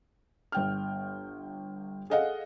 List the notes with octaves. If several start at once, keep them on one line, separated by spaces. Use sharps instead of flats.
G1 G5 F6
G#4 A4 D#5 F5 F#5